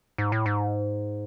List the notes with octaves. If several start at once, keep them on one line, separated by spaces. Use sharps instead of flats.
G#2
A2
G#2